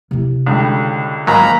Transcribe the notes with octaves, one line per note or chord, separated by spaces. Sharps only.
C3 E4
C#2 D3 G3
G#2 D#3 F#3 A#3 A#5 B5